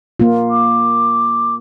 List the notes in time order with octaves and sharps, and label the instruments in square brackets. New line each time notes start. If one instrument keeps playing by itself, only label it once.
[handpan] A#3 F4
[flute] D6